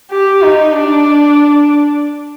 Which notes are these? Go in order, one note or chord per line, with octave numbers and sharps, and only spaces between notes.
G4
D#4
D4